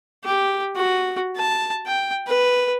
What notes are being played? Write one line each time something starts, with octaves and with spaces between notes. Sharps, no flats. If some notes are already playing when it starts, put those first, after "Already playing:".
G4
F#4
A5
G5
B4